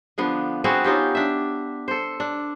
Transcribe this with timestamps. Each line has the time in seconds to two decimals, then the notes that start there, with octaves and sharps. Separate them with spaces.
0.18 D3 F3 B3 D4
0.64 B3 C4 F#4 G#4
0.84 C#4 D#4 F4 G4
1.15 D4 E5
1.88 A4 C5
2.20 D4